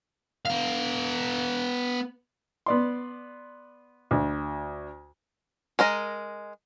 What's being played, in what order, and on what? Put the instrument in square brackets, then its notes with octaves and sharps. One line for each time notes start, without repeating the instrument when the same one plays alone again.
[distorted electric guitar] B3 F5
[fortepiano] B3 D5 C6
D2
[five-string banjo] G#3 A#4 D#5